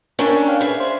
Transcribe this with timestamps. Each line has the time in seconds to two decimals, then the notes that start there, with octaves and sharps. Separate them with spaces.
0.19 C#4 D4 A4 A#4 C#5 G5
0.47 C#5 F5 G5
0.61 G#4 B4 E5
0.80 C5